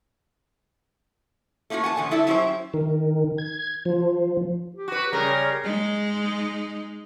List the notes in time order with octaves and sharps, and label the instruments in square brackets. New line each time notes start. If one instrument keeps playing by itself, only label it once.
[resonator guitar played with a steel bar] A3 A#3 C#4 D#4 F#4
F#5 G#5 A5
A#2 D3 F3 A3
D3 E4 A4 E5 A5
F#3 C#4 E4 G4 C5 E5
[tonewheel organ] D#3
G#6
F3
[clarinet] G4
[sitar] F#4 B4
[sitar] C#3 G3 A#4 [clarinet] A#5
[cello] G#3 D#4